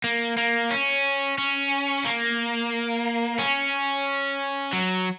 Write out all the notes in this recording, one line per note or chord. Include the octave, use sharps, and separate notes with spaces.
A#3
A#3
C#4
C#4
A#3
C#4
F#3